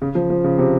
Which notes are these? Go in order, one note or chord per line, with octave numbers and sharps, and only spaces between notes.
C#3
F3
F3
C#3
C3